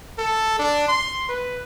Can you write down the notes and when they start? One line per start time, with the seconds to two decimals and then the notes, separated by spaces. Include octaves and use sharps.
0.18 A4
0.59 D4
0.88 C6
1.29 B4